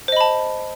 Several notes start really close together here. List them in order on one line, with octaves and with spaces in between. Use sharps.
C5 D#5 B5 A5